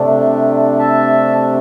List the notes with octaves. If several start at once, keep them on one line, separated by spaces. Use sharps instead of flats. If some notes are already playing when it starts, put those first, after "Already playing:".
Already playing: C3 A3 D4
E5 A5